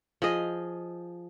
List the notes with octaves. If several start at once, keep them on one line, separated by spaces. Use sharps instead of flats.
F3 G#4 D#5